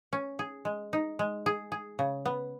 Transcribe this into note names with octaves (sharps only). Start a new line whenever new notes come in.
C#4
G#4
G#3
D#4
G#3
G#4
G#4
C#3
B3